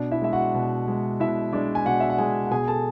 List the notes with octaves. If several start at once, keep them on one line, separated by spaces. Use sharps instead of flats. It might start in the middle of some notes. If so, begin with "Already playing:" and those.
Already playing: B2 D4 D5
E4 E5
G#3 E5
F#4 F#5
B2
G#3
B2 E4 E5
G#3 D4 D5
G#5
B2 F#4 F#5
E5
F#5
G#3 G#4 G#5
F#5
B2 G#4 G#5
A4 A5